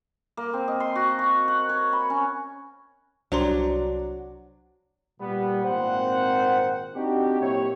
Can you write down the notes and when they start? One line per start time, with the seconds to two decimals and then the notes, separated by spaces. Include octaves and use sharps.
0.37 A#3
0.53 C4
0.68 D#5
0.80 C6
0.96 F#4
1.19 C#6
1.48 F#5
1.69 C#5
1.93 B5
2.10 C#4
3.32 C2 F#3 D4 C5 A#5 C6
5.21 A#2 G3 B3
5.65 G#1 A#2 A#3 C4 C5 F#5
6.96 C4 D4 D#4 F#4 G4
7.40 A#2 F#3 C4 E4 G4 C#5